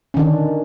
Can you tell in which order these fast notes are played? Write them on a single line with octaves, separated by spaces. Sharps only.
C#4 D#3 D4 D3